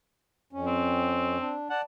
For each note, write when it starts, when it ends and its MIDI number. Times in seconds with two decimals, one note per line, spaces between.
0.53 1.37 41
0.53 1.37 61
0.66 1.56 60
1.40 1.68 62
1.70 1.82 74
1.70 1.80 78
1.70 1.82 81